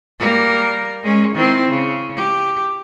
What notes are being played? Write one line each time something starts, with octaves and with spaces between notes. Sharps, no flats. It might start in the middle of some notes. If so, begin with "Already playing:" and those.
G3 A#3 A#4
G#3 C#4
D#3 C4 E4
C#3
G4